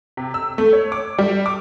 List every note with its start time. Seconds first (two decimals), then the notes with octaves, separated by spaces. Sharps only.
0.17 C3
0.34 E6
0.58 A3
0.73 C#5
0.92 D6
1.18 G3
1.46 D6